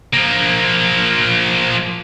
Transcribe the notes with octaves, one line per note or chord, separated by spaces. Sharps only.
F3 A#3